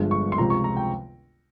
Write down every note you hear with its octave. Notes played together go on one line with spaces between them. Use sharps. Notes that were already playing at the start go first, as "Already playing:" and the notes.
Already playing: G1 G2 F3 G#3
C#6
C6
C#2 C3 F3 G#3 A#5
C#6
A#5
G5